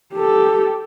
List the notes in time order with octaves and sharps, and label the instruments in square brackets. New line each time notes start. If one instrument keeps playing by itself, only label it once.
[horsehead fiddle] G4 A4